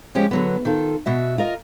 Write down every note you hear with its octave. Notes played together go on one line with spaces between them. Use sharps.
F3 G#3 C#4 G4
D3 F#3 B3
D#3 F4 A4
B2 F#4 E5
F4 A#4 D#5